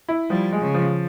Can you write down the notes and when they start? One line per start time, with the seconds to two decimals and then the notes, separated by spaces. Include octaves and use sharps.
0.09 E4
0.30 F3 G3
0.52 G#3
0.61 C#3
0.74 F3